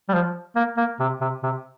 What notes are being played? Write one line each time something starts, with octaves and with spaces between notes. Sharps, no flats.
G3
F3
A#3
A#3
C3
C3
C3